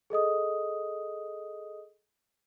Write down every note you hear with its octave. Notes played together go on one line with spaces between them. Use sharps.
G#4 A4 D#5 D#6